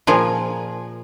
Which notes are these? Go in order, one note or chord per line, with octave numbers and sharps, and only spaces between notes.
A#2 F3 G#4 A#4